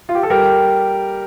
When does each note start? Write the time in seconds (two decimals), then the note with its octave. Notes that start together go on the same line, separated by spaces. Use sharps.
0.09 F4
0.15 G4
0.23 A4
0.30 G3 G4 A#4